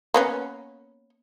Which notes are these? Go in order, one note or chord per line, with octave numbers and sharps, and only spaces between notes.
A#3 B3 C#4